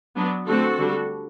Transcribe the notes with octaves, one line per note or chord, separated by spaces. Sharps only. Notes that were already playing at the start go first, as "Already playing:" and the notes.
F#3 B3 D4
D3 A3 C4 F#4 A4
D3 G3 D4